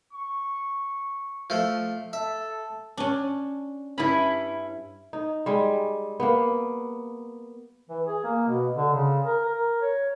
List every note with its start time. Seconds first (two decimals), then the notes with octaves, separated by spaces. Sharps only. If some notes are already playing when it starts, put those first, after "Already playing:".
0.13 C#6
1.50 F3 A3
2.13 A4 E5
2.97 C#4 D4
3.98 G2 C#4 E4 B5
5.13 D#4
5.46 G3 G#3
6.20 A#3 B3
7.89 E3
8.06 G#4
8.24 A#3
8.48 B2
8.76 D3
8.93 C#3
9.25 A#4
9.45 A#4
9.82 C#5